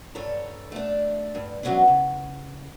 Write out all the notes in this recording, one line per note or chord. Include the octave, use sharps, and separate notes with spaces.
G2 A4 C#5 A#5
A3 D4
G2
E3 F#3 G3 B3 C#4 D4
C#3